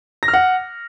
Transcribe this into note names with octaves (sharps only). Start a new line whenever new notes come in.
A#6
F6
F#5